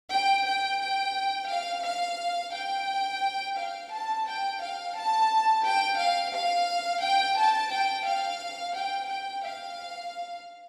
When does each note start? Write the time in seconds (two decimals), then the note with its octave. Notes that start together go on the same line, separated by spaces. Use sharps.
0.12 G5
0.47 G5
0.82 G5
1.50 F5
1.86 F5
2.55 G5
3.59 F5
3.93 A5
4.27 G5
4.62 F5
4.97 A5
5.65 G5
6.00 F5
6.34 F5
7.03 G5
7.38 A5
7.73 G5
8.06 F5
8.76 G5
9.10 G5
9.44 F5